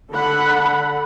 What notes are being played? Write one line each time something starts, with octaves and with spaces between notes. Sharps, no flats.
D3 A4 F#5 B5